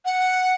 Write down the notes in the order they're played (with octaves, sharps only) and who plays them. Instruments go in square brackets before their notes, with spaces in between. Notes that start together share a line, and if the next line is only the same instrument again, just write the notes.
[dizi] F#5